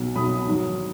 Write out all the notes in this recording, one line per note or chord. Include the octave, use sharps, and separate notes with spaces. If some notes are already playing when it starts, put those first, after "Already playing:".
Already playing: B1 B2 F#3
B1 B2 F#3 B5 D#6
G#2 D#3 F#3